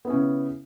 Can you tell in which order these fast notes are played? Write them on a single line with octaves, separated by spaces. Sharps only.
B3 E4 C#4 C#3